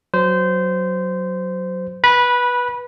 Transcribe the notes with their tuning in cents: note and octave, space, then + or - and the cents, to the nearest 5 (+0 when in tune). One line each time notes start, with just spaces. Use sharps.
F#3 +0 C5 -20
B4 -15 B5 -25